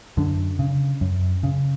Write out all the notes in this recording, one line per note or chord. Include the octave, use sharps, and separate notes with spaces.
F#2 D3
C#3
F#2
C#3